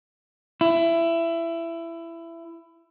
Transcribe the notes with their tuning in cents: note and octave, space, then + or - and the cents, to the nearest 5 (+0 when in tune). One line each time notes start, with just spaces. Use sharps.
E4 +20